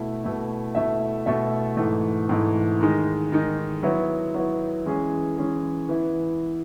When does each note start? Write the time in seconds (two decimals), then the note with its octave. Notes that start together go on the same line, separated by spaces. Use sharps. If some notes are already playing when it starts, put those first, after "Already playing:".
Already playing: B2 A3 E4
0.24 B2 A3 E4
0.75 B2 A3 E4 A4 E5
1.26 B2 A3 E4 A4 E5
1.77 G#2 E3 A3
2.29 G#2 E3 A3
2.80 D#3 G#3 D#4
3.32 D#3 G#3 D#4
3.83 F#3 B3 E4
4.34 F#3 B3 E4
4.86 E3 G#3 C#4 G#4
5.37 E3 G#3 C#4 G#4
5.89 E3 B3 E4